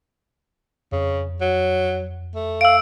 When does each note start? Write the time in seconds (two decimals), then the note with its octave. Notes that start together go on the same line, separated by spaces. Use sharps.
0.92 F2 C#3
1.41 F#3
2.35 A3
2.61 F5 E6 D7